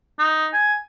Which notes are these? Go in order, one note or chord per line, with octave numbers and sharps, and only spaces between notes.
D#4
G#5